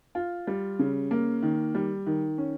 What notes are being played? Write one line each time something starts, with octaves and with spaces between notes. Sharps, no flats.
F4
G3
C#3
A#3
D#3
G3
D#3
C#4